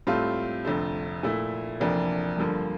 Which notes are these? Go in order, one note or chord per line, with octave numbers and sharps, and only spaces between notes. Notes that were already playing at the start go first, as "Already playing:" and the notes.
A2 G3 C4 F4 A4
F1 F2 D3 A3
A#2 A3 E4
F1 F2 E3 A#3 D4
G2 D3 F3 A#3